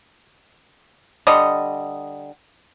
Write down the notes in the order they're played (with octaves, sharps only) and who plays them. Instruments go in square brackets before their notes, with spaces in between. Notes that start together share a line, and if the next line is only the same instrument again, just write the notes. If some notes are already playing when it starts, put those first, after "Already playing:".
[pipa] D3 G3 D#5